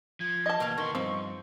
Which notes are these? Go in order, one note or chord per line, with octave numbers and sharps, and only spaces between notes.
F3 G#6
D#5 A5
E2 B2 A#3 F5
D#2 D#3 C6 C#6
G2 F3 C4